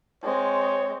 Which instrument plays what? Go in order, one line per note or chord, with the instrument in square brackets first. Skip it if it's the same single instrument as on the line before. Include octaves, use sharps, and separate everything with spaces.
[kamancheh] G#3 C4 [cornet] C#5